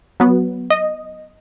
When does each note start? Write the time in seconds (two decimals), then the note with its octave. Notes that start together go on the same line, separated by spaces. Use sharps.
0.20 F#3 B3
0.70 D#5